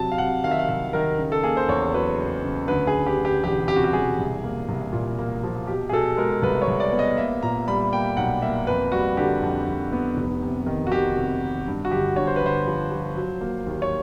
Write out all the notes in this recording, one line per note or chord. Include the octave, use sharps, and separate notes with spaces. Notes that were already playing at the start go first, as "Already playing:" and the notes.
Already playing: C3 F#3 A5
F5
C3 F#5
D#3 F5
E5
F5
C2 E5
D#3 A#4
C#3
A4
A#3 G#4
C5
E2 C#5
F#3 B4
C#3
C#3
D2 B4
G#4
D2
G4
D2
G4
E1 G4
C3 G4
F#4
G4
E1 G#4
C2
A#3
C2
A#2
A#3
F3
B2 G4
G#4
B2 A4
G#3 A#4
C2 B4
C#5
C2
D5
B3
D#5
A#3 E5
A#2 A#5
G3 B5
A#3 G5
B1 F#5
A#3 E5
F2 B4
G3 F#4
D3 G4
F2
F2
B3
F1
C3
D#3
F#4
D#3 G4
C3
D#3
G2
F#4
G1 G4
G2 C#5
C5
B4
G1 C5
F3
F3
F#3
A#3
D#2
C#5